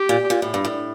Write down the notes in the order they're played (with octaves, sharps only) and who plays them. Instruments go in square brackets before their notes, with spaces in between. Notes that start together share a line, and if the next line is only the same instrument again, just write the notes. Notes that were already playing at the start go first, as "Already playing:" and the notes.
Already playing: [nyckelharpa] G4
[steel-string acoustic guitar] A#2
A#2
A2
G2
A2